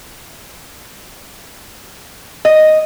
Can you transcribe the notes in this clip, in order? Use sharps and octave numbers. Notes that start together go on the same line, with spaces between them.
D#5